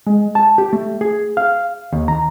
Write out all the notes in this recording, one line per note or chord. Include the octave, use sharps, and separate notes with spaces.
G#3
A5
G4
A3
G#4
F5
D#2
A#5